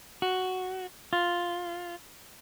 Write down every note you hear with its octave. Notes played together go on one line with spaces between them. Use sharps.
F#4
F4